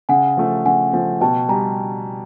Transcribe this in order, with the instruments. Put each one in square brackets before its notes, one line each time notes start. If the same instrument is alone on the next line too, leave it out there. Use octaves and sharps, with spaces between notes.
[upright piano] C#3 [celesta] F#5 G#5
[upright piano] F3 A3
[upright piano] C#3 [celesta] F#5 G#5
[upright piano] F3 A3
[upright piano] B2 [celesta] G5 A5
[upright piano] G3 [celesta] G#5 A#5